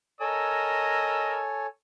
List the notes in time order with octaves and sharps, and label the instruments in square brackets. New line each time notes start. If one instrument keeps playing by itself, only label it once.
[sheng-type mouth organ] A4 C#5 G#5 [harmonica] A#4 D#5 E6